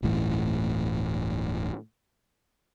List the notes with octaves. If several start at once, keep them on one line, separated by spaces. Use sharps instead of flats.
D1 G1 A2 E3